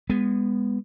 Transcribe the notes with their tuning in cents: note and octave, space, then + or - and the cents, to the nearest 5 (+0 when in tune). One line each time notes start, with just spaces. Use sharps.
G#3 -30 B3 +0